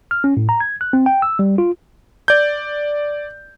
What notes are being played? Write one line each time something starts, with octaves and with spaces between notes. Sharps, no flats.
F6
C#4
A2
A#5
G#6
F#6
C4
G5
E6
G3
F4
D5 G6